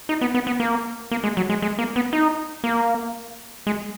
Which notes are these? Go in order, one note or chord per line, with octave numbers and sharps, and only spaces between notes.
D#4
B3
B3
B3
A#3
A#3
G#3
F#3
G#3
G#3
A#3
B3
D#4
A#3
G#3